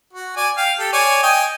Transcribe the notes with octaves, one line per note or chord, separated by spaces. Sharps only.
F#4
D5 G#5
F5 G5
G4 A4
C#5 D5 G#5
D#5 G5 G#5